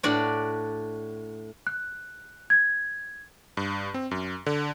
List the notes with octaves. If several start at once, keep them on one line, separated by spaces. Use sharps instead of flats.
A2 D4 F#4 D5 B5
F#6
G#6
G2
C4
F#2
D3